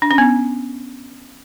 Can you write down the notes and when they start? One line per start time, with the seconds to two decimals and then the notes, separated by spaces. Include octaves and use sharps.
0.02 D4
0.11 C#4
0.18 B3